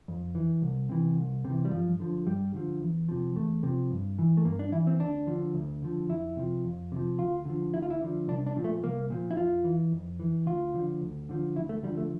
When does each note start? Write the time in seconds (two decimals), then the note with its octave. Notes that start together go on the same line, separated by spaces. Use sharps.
0.08 F2
0.35 E3
0.62 C2
0.89 C3 E3
1.17 C2
1.45 C3 E3
1.65 G3
1.71 G2 F3
2.00 D3 F3
2.26 G2 G3
2.53 D3 F3
2.81 E2
3.09 C3 F3
3.36 E2 A3
3.63 C3 F3
3.91 G2
4.19 E3
4.37 A3
4.45 G2 A#3
4.59 D4
4.72 E3 E4
4.87 C4
5.00 D2 D4
5.27 D3 F3
5.55 D2
5.82 D3 F3
6.09 F2 E4
6.37 C3 F3
6.65 F2
6.92 C3 F3
7.18 D2 F4
7.45 D3 F3
7.73 D2 E4
7.82 F4
7.90 E4
8.01 D3 F3
8.28 C2 D4
8.46 D4
8.56 A#2 F3
8.64 A3
8.83 C2 A#3
9.10 A#2 F3
9.31 E4
9.37 F2 F4
9.64 E3
9.92 F2
10.20 E3
10.46 D2 F4
10.74 D3 F3
11.01 D2
11.29 D3 F3
11.56 D2 E4
11.69 A3
11.83 D3 F3 G3
11.97 A3